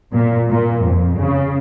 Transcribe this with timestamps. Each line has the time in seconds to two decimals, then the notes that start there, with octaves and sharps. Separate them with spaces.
0.13 A#2
0.48 A#2
0.84 F2
1.18 C#3